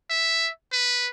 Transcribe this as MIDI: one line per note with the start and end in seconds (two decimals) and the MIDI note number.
0.10 0.50 76
0.72 1.09 71